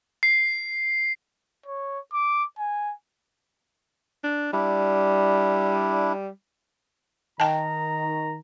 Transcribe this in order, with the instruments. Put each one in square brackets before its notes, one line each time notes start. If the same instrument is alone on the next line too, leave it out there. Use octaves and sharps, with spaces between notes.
[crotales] C7
[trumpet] C#5
D6
G#5
[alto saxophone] D4
[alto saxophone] G3 [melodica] D4 E4
[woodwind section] D#3 [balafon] G5 A5 [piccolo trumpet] A#5